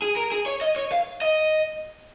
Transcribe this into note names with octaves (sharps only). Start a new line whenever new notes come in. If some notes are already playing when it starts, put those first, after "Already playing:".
G#4
A#4
G#4
C#5
D#5
C#5
F5
D#5